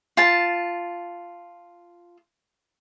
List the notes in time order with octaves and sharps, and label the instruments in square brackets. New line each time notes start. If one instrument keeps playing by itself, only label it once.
[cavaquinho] F4 A5